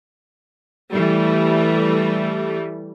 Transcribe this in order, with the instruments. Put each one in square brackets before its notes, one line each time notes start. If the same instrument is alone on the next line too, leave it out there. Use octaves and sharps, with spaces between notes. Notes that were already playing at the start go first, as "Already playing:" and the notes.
[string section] E3 G3 A3